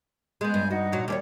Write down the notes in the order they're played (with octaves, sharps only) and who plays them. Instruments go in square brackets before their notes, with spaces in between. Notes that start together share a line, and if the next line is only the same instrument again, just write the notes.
[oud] G#3 B3 [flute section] G#5 G6
[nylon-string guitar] G2
[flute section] D#4 D#5 F#5 [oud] F#4
[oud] A#2 F#3
[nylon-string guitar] D#2 [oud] G3 D4 C#5 [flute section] D5 D6